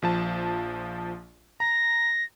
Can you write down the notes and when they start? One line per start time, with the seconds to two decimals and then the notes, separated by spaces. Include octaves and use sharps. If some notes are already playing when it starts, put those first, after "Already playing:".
0.02 A#1 F3 A5
1.60 A#5 A#6